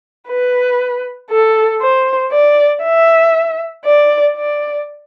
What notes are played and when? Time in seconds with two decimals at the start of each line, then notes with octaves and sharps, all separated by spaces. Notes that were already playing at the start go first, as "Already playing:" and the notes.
0.29 B4
1.31 A4
1.81 C5
2.32 D5
2.84 E5
3.85 D5
4.36 D5